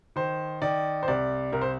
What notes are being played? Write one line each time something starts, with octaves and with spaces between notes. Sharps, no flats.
D#3 C5
D#3 D5
C5
C2 D5
C2 A#4
C5